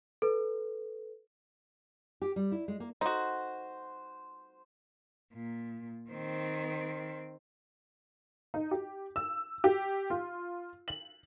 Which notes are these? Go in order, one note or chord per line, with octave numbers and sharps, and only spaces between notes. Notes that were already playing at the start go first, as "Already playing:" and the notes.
A4 B4
G4
G3
E4
G#3
A#3
D#4 F#4 C5
A#2
D#3 C4
D#4
G4
E6
G4
F4
F#7